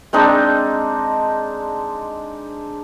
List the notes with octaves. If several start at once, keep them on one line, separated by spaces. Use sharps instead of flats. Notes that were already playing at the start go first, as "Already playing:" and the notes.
G#3 C4 D4 D#4